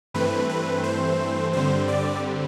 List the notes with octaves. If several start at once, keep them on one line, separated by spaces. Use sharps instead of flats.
G2 E3 A3 C4 B4
B4
C5
G2 D3 G3 C4 C5
D5